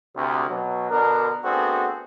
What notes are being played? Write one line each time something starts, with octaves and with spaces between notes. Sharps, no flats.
D2 C3
B2 F#3
B2 D3 D4 A#4
A3 B3 C4 D4 F#4 G#4